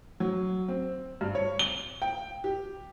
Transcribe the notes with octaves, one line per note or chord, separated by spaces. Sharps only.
F#3
C4
G2
C#5
G7
G5
G4